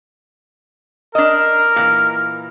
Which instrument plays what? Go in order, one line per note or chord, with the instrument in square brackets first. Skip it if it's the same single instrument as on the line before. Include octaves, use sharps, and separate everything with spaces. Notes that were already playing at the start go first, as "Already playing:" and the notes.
[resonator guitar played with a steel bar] D4 D#5 [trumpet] A#4
[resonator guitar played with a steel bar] A#2 E3